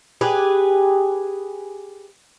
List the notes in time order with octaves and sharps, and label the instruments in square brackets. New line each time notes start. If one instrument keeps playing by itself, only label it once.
[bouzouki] G4 G#4 B4